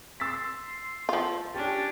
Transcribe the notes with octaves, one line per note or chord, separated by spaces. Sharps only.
C6 E6 A6 B6
F3 F4
C#4 D4 G4 A5